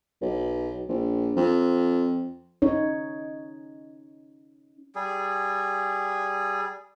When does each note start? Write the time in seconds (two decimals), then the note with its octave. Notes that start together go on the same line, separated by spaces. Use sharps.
0.21 B1
0.89 A#1
1.37 F2
2.62 C#4 D#4 C#5
4.95 G3 G#4